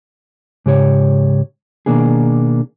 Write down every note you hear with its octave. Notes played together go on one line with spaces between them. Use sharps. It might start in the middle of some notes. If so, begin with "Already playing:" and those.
G#2 C#3 G4 C#5
B2 D#3 A#3 D4 G#4